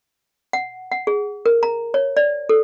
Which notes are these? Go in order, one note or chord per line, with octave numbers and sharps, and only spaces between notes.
F#5
F#5
G#4
A#4
A#5
C#5
D5
A4